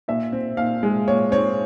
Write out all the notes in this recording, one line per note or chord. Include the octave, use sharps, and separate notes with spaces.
A#2 E5
C4
A#2 F5
G#3
A#2 C#5
C4 C#5